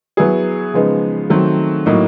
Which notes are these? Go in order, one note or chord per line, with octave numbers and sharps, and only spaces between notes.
F#3 B3 E4 G#4
C#3 F3 G#3 B3 D#4
D#3 F#3 A3 C4
A2 F#3 A#3 D#4